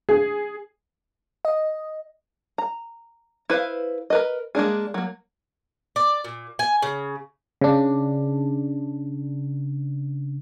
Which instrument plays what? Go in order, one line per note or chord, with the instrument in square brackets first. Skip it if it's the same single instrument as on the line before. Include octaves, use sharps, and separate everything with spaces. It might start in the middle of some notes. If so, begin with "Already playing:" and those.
[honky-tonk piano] G#4
[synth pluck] D#5
[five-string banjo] A#5
E4 B4 C5 F5
A#4 B4 D#5
G#3 A#3 D4 G#4
F#3 A#3
[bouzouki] D5
A#2
G#5
C#3
[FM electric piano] C#3 D4